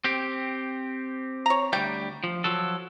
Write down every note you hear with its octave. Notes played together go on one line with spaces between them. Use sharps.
C4 G4
C#5 A#5
D2 G3 G5
F3
F3 F#3 A4